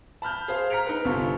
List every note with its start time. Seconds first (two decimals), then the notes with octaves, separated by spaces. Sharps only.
0.22 A5 B5 F6 G6
0.48 G#4 C5 F5
0.70 A#5 F6 B6 C#7 D7 F7
0.86 D#4 B4
1.05 G1 C3 F4 C#6